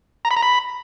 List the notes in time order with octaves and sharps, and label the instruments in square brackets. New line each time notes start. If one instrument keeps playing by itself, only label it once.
[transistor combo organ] A#5
B5
A#5
B5